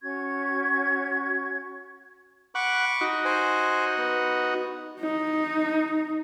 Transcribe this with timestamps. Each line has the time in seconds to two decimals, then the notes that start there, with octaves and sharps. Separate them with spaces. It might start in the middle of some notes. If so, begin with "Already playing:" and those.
0.01 C#4 F#4 C#6 G#6
2.55 F#5 B5 C#6 D6
3.01 D#4 F#4
3.25 C5 G#5
3.98 B3
5.00 D#4